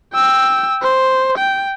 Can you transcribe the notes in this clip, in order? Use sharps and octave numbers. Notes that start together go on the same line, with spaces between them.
G5 E6
C5
G5